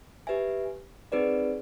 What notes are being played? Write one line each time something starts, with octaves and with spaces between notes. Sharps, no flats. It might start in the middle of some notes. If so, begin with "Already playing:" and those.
G4 B4 E5 G#5
C4 D#4 G#4 B4 D5